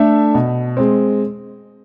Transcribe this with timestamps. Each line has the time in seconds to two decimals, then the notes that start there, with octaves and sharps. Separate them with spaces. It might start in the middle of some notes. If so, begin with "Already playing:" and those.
Already playing: A3 D4 A4 E5
0.34 B2
0.77 G#3 C4